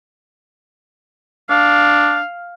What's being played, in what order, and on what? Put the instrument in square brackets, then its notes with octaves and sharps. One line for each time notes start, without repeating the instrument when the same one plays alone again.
[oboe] D4 [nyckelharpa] F5